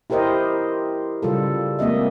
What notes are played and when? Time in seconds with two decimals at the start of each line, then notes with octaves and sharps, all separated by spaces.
0.10 E4 G4 A#4 C5 D#5
1.22 C#3 G3 F4 A4
1.79 G#3 A#3 C4 D#5 E5